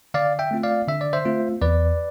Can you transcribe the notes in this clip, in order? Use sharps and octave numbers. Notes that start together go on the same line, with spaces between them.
D3 D5 F5
E5 G5
A3 C4 F4
D5 F5
D3 E5
D5
C5 E5
A3 C4 F4
E2 B4 D5